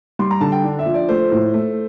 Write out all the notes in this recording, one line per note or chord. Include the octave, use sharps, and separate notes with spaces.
G3 C6
A#5
D3 A5
G5
D4
E5
F3
D5
A3 C5
A2
A3